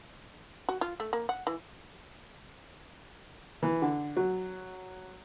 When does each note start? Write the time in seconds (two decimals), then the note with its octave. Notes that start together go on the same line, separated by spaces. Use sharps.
0.69 F#4
0.81 F4
1.00 A3
1.13 A#3
1.29 F#5
1.47 E3
3.63 E3
3.82 D3
4.17 F#3